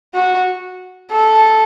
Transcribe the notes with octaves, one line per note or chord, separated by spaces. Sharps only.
F#4
A4